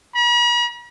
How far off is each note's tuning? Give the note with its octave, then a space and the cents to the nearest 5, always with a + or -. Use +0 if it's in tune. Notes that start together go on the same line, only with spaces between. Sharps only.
B5 -45